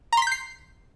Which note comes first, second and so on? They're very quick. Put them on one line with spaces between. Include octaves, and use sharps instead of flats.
A#5 C6 B6 G6 C7